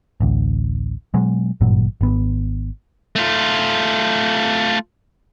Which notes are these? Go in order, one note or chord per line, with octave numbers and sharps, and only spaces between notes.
A1 D2
B2 F#3 G#3
G#1 G2 A#2 F#3
G#1 B3
A3 F4